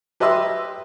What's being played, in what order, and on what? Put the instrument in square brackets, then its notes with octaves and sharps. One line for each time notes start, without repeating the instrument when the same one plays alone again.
[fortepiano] G4 B4 D#5 E5 C6 E6